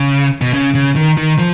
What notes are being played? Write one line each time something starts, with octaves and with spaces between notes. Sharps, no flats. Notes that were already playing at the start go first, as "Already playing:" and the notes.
Already playing: C#3
B2
C#3
C#3
D#3
D#3
F3